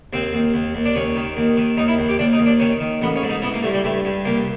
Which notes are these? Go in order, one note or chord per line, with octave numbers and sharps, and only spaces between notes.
D#2 C4
D#2
D#2
D#2
D4
D#2 C#4
D#3
D#2
D#3
D#2 D#4
E4
D#2
G4
D#2 D4
D#4
D#2
D4
D#3 C#4
D#3
A1 B3
C#4
G#2
D#4
E3 B3
A#3
G2 A3
G3
G2 A3
G2
C2 A#3